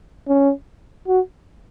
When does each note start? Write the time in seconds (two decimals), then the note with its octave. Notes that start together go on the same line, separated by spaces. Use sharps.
0.28 C#4
1.08 F#4